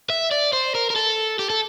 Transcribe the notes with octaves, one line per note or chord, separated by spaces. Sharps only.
E5
D5
C5
A#4
A#4
A4
G4
A4